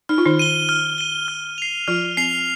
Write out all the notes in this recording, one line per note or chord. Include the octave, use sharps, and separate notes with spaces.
D#4 F6
F4
D#3 D#4
D#7 G7
F6
D#7 G7
F6
C7 F7
F3 F4 F6
C4 C7 F7